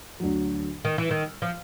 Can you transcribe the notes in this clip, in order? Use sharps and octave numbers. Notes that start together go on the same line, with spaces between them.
D2 D3 F#3
D#3
E3
D#3
F3